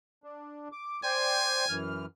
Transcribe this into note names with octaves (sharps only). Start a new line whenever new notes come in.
D4
D6
C5 D5 G5 G#5
F#2 E3 F6